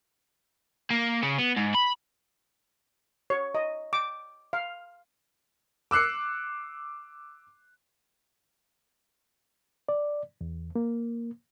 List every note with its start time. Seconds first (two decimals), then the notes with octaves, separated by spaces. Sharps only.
0.90 A#3
1.23 C#3
1.39 B3
1.57 G#2
1.75 B5
3.30 C#5
3.55 D#5
3.93 D6
4.53 F5
5.91 D6 E6 F#6 C7 C#7
9.89 D5
10.41 E2
10.76 A#3